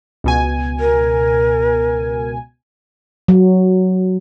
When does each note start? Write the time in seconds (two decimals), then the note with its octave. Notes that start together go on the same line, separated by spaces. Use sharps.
0.24 C#2 B2 G#5
0.80 A#4
3.28 F#3